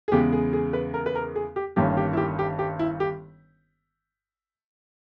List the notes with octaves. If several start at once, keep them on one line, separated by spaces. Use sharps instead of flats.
G#4
E2 C#3 G#3 B3 G4
G#4
G#4
B4
A#4
B4
A#4
G#4
G4
G1 G2 D#3 A#3 C#4 G4
G4
E4
G4
G4
G4
E4
G4